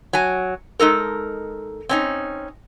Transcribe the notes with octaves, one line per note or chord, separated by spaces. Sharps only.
F#3 G#5
G#3 D#4 A4 A#4
C4 C#4 D#4